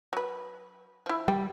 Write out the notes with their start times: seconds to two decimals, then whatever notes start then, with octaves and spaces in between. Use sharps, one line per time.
0.13 F#3 B4
1.06 F3 E4
1.28 G3 G5